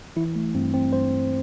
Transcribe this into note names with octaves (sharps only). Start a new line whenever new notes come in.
E3 E4
A3
G2 C4
C4
G2 C5